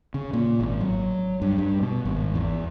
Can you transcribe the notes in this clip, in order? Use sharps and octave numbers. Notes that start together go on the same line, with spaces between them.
C#3
A#2
G#1
F#3
G2
G2
B2
G#1
E2